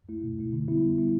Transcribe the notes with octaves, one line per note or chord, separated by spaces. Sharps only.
A3 E4
B2
A3 E4
D3
G3 B3 E4
D3
G3 B3 E4